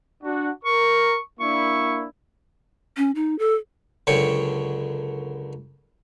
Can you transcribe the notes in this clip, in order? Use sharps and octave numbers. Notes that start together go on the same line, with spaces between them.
D4 F#4
A#4 C#6
A#3 D4 E4 C#6
C#4
D#4
A4
C#2 F#2 D3 C#5 G5 C#6